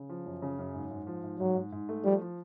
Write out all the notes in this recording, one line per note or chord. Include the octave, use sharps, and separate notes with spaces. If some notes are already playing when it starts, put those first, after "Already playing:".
Already playing: C#3
F3
F#2
C#3
F#2
G#2
G#2
F3
G#2
G#2 F#3
G#2
G#2
A3
F3 G3
F3